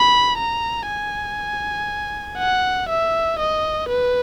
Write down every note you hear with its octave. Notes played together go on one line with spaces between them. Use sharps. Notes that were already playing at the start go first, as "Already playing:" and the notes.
Already playing: B5
A#5
G#5
F#5
E5
D#5
B4